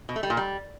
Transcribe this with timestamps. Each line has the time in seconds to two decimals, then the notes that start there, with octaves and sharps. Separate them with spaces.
0.09 B2
0.16 A3
0.23 G3
0.30 A#2
0.37 G3